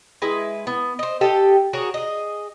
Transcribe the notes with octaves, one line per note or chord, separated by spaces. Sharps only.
G#3 E4 B4
B3
C5 D#5
G4 A4 D#5 G5
F#4 G#4 A#4 C#5
G#4 D#5